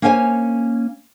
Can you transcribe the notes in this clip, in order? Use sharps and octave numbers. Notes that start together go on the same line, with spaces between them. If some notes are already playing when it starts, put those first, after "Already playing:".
A#3 C#4 C5 C#5 G5 G#5